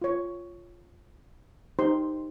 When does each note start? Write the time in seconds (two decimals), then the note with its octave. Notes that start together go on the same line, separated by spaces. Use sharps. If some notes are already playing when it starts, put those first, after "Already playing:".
0.02 F4 C#5
1.79 D#4 G4 C5 C6